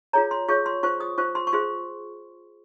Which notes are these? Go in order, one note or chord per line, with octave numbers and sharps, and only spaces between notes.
F4 G#4 C#5 A#5
C6
F4 G#4 C#5 C#6
C6
F4 C5 C#6
D#6
F4 C5 C#6
C6
C#6
F4 G#4 C5 C6